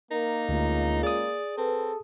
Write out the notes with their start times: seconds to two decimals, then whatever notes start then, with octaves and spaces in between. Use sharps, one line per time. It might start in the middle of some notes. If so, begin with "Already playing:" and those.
0.11 A#3 D#4 A#4
0.49 D2 G#3 C#4 F4
1.03 G#4 D5 D#6
1.58 C4 A4 B4